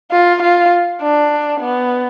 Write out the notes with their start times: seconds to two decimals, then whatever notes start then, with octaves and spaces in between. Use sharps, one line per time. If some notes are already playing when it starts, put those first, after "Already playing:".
0.12 F4
0.43 F4
1.01 D4
1.60 B3